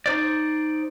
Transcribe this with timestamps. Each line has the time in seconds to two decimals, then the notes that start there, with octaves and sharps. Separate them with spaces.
0.06 D#4 C5 D5